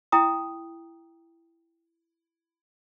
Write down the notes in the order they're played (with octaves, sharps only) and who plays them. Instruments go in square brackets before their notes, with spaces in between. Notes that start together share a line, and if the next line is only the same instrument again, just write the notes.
[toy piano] E4 G5 A#5 D#6